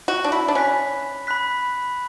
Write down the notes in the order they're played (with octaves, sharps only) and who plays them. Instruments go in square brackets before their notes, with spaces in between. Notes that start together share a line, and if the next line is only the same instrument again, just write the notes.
[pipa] F#4
D4
E4
D4
[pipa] C#4 [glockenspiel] B5 F#6 B6
[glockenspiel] B5 F#6 B6